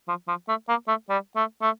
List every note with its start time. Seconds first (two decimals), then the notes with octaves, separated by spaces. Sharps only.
0.08 F3
0.28 F3
0.48 A3
0.69 A#3
0.88 A3
1.09 G3
1.36 A3
1.62 A3